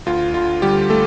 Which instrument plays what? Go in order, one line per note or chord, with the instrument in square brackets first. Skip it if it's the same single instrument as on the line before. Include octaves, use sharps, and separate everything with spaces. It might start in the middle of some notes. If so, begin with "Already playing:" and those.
[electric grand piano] D2 F4
D3 F4
D3 G3 G4
A3 A4